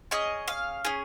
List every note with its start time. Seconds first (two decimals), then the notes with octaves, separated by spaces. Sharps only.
0.11 C#4 G#4 D#5
0.48 F5
0.85 C#4 G#4